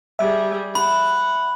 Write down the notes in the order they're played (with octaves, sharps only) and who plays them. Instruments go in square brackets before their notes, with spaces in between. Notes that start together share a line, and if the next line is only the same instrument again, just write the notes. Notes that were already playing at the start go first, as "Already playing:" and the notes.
[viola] G3 G#4 [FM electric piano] E5
[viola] F#5 [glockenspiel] B5